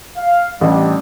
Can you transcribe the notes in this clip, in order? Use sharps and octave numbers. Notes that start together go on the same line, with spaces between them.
F5
A1 G3 D4